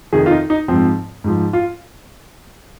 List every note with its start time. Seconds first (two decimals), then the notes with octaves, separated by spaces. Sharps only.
0.12 F2 C3 D#3 G#4
0.26 F4
0.31 D#4
0.50 D#4
0.68 G#2 F3 C4
1.24 G#2 F3
1.53 F4